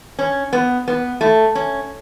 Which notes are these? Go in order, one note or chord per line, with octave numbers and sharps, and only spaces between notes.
C#4
B3
B3
A3
C#4